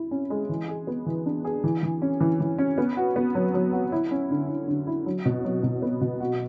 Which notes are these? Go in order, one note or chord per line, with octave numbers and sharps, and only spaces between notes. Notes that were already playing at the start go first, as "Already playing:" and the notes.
Already playing: E4
C#4
G#3
E3
G#4
B3
E3
D4
G#4
E3
E3
C#4
E3
E3
C#4
B3
F#4
B3
F#3
F#3
F#4
E4
C#4
D3
E4
D3
E4
F#3
B2
F#3
B2
B3
B2
F#4